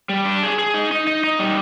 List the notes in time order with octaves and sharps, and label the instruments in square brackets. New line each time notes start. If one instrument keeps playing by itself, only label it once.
[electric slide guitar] G3
D4
G#4
G#4
D#4
D#4
D#4
D#4
G3